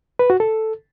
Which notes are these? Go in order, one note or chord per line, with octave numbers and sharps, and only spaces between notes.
B4
F#4
A4